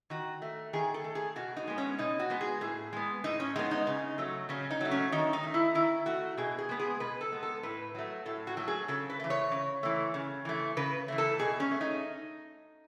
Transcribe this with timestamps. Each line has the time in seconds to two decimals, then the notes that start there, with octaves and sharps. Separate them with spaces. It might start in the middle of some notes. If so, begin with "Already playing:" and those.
0.10 D#3 F#4
0.42 A3
0.73 D#3 G#4
0.94 A4
1.04 A3
1.15 G#4
1.36 B2 F#4
1.57 D#4
1.68 G#3 B3
1.78 C#4
1.99 B2 D#4
2.19 F#4
2.30 G#3 B3
2.41 G#4
2.61 A2 G#4
2.93 G#3 B3
3.24 A2 D#4
3.40 C#4
3.56 G#3 B3 D#4
3.71 D#4
3.87 C#3
4.18 F#3 A3
4.49 C#3 C#4
4.71 D#4
4.81 F#3 A3
4.91 C#4
5.12 D#3 D#4
5.33 D#4
5.43 A3
5.54 E4
5.75 D#3 E4
6.06 A3 F#4
6.37 B2 G#4
6.58 G#4
6.69 G#3 B3
6.80 G#4
7.00 B2 B4
7.21 A4
7.32 G#3 B3
7.43 A4
7.63 A2 B4
7.95 F#3 A3
8.26 A2 A4
8.47 F#4
8.57 F#3 A3
8.68 G#4
8.88 C#3 A4
9.10 B4
9.20 E3 A3
9.30 C#5
9.51 C#3
9.83 E3 A3
10.14 C#3
10.45 E3 A3
10.77 C#3 B4
11.08 E3 A3
11.18 A4
11.39 B2 G#4
11.60 C#4
11.71 A3
11.81 D#4